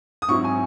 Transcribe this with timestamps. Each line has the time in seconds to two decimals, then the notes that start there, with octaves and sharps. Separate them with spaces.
0.22 D#6
0.28 G#2 F#3 C4 E4 C#6
0.44 G#5